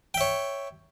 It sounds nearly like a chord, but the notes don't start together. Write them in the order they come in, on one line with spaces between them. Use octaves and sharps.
G5 E5 C#5